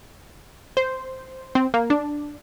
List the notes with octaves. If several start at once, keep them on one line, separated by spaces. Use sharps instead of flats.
C5
C4
A#3
D4